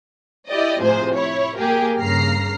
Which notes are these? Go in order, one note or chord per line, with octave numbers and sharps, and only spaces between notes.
E4 G4 D5 D#5
A2 C3 F3 G#4 C5
E4 C#5
A#3 G4 G#4 A#4
G2 C#3 A#3 A#5 F6 C7